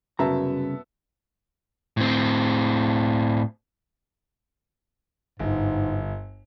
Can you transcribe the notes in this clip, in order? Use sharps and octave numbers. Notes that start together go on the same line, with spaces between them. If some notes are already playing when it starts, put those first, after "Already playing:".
C2 F#2 C#3 B3 E5 A5 A#5
A2 C4
G1 G#2